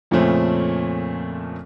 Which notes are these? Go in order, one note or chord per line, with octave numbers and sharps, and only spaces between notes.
F2 A#2 C#3 A3 C4 C#4